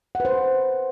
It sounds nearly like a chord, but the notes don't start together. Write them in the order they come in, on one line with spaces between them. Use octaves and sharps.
F#5 B4 C5